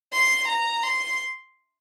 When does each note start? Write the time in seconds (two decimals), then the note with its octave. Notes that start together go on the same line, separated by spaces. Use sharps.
0.13 C6
0.48 A#5
0.83 C6